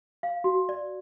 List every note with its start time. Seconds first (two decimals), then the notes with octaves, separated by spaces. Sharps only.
0.23 F5
0.44 F#4
0.69 D5